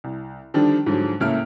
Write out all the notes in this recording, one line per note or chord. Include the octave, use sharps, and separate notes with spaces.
C2
D3 D#3 F3 G3 D4
G#2 D3 F3 F#3
C#2 A2 A3 A#3 F6 D7